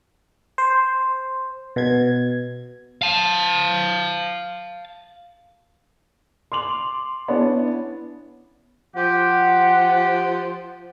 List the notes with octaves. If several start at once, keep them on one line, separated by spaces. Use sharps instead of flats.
C5
B2 G#6
F5 A5
C6 D6 F7 F#7
B3 C#4 D4 E4 B4 C#5
F3 G4 F#5